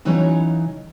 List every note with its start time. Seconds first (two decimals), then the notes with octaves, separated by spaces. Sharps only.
0.05 C#3 E3 F#3 C#4 D#4 C#5